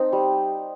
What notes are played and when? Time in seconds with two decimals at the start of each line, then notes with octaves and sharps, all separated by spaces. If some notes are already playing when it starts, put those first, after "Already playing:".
Already playing: C4 D#4 C5
0.12 G3